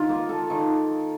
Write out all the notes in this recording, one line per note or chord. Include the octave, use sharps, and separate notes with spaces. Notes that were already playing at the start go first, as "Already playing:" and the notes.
Already playing: D#3 F4
A#3
A4
D#3